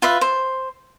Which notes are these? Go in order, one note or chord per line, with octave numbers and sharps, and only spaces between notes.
F4 B4 E5
C5